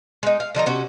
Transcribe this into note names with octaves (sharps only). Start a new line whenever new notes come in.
G#3 D#4
F5
D3 F3 D#4 A#5
C3 C#4 F#4